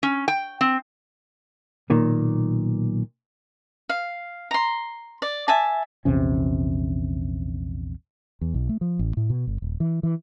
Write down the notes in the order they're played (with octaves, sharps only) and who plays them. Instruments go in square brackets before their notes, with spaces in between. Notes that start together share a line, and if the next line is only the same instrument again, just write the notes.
[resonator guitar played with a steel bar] C#4
G5
C4
[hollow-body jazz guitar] B1 A#2 D#3
[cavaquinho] F5
A#5 C6
D5
E5 G#5 A5
[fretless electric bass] A#1 E2 C3 C#4
E2
B1
A3
F3
A1
A2
B2
G1
D#1
E3
E3